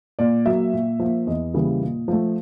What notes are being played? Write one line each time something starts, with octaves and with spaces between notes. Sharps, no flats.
A#2 D5
F#3 A#3 E5
A#2
F3 A#3
E2 D#5
C#3 E3 G3 A#3
A#2
F3 A3